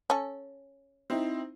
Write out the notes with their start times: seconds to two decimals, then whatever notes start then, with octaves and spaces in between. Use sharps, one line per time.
0.10 C#4 A4
1.10 C4 D#4 E4